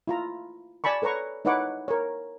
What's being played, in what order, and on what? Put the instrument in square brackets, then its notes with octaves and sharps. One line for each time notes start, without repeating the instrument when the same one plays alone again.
[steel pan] E4 F4 A#5
D5 G#5 A5 B5 C#6
A4 B4 C#5 A#5 C#6
D#4 E4 B4 C#5 F#5 D6
A#4 C#5